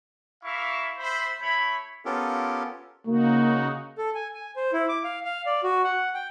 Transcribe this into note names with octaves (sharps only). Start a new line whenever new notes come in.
E4 A#4 E5 F5 C#6 D6
C5 E5 B5
A3 E4 C#5 B5
B3 C#4 F4 G4 A4 A#4
C#3 A#3 D#4 F#4
A4
G#5
G#5
C5
E4
D6
F5
F5
D5
F#4
F#5
G5